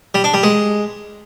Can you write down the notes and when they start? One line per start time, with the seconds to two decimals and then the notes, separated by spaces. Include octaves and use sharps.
0.14 G3
0.24 D4
0.34 G3
0.43 G#3